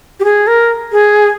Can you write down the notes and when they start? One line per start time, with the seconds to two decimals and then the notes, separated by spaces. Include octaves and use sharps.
0.20 G4
0.24 G#4
0.47 A#4
0.92 G#4